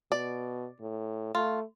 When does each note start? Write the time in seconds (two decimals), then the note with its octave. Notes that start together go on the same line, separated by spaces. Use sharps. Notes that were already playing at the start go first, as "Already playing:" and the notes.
0.12 B2 D5
0.81 A2
1.35 A3 F4